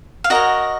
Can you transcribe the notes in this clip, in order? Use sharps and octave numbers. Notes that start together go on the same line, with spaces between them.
F5
F#4 A#4 C#5 D#5